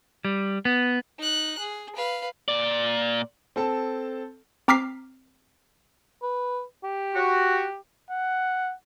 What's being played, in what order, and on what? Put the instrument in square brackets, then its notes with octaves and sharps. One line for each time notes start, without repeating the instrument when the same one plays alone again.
[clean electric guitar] G3
B3
[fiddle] D#4 F#6
G#4
B4 F5
[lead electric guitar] A#2 D5
[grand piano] C4 A4 A5
[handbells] C4 A#5 D6 F6 B6 C7
[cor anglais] B4
G4
[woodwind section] F#4
[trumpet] F#5